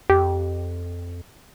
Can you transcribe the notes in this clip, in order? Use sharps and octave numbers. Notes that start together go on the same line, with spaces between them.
F2 G4